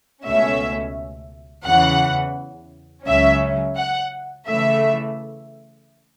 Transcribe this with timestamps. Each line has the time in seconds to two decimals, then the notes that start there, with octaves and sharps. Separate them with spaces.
0.24 C#2 B2 A3 C#4 E5
1.66 E2 C#3 E3 F#5
3.06 C#2 C#3 F#3 C#4 E5
3.77 F#5
4.47 C#3 E3 A3 E5